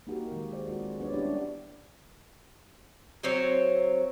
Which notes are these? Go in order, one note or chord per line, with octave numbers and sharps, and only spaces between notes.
A#3 D#4 F#4 G4 A#4
D#3 G#3
G#4 C5 D5
G#3 C4 F4 F#4 G#4
B3 D4 B4 C#5 D5
G3 G#3 C#4 D4 E4 G4
F#3 C4 C5 C#5